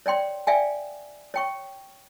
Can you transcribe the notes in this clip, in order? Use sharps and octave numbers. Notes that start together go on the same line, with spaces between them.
C#5 D5 G5 C6
D5 E5 F5 G5 G#5
C#5 G5 C#6